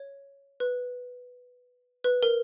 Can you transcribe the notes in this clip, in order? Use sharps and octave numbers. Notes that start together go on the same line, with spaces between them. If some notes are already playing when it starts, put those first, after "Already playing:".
Already playing: C#5
B4
B4
A#4